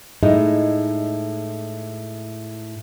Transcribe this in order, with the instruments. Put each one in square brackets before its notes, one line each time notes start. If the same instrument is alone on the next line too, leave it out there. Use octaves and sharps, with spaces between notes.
[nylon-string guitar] A2 G#3 D#4 E4